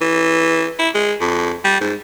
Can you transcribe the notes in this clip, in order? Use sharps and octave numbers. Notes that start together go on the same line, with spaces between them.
E3
E4
G#3
F2
G3
G#2